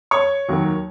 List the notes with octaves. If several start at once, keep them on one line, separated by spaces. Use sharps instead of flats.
C#5 C#6
D#2 D#3 F#3